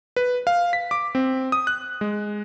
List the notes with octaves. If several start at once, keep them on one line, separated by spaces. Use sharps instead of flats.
B4
F5
B6
D6
C4
D#6
F#6
G#3